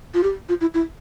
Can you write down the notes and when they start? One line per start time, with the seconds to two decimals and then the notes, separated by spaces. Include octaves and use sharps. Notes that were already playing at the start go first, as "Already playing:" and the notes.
0.14 F4
0.23 G4
0.49 F4
0.61 E4
0.74 E4